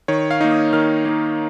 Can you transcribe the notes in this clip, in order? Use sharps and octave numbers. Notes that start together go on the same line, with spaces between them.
D#3 C#5
F5
A#3 D#4
D#6
D#3 F6
A#3 D#4